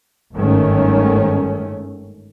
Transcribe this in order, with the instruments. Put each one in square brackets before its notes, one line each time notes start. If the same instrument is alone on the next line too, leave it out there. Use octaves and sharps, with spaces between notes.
[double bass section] G1 G#2 D#3 A3 C#4